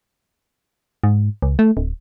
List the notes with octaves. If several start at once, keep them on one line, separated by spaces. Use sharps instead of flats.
G#2
C#2
A3
D1